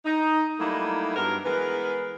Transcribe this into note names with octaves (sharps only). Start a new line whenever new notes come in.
D#4
F#3 G3 A3 A#3 D#4 E4
G2 F#3 B3 A#4
E3 G#3 B3 A#4 B4